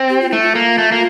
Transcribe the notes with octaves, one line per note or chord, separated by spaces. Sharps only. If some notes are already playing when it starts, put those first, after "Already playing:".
Already playing: C4
G4
F4
A3 E4
F4
A#3
A3
A#3